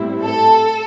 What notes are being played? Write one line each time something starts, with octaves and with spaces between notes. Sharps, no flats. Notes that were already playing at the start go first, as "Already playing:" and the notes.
Already playing: A2 G3 C4 E4
A4